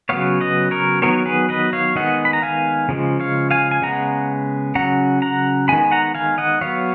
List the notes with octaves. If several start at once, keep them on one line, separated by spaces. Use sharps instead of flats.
C#3 F#3 B3 C#5 F5
B4 D#5
A#4 C#5
D#3 F#3 B3 A#4 C#5
G#4 B4
B4 D#5
C#5 F5
D#3 G#3 B3 D#5 F#5
B5
A#5
F5 G#5
C#3 F3 G#3
C#5 F5
F5 G#5
G#5
C#3 G#3 B3 F#5 A#5
C#3 F#3 C#4 F#5 A#5
F#5 A#5
D#3 G#3 B3 G#5 B5
F#5 A#5
F5 G#5
D#5 F#5
F#3 B3 C#5 F5